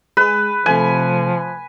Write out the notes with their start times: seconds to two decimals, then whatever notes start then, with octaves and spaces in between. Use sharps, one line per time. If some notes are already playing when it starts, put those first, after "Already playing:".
0.17 G#3 G#4 B4
0.66 C3 F3 A3 G#5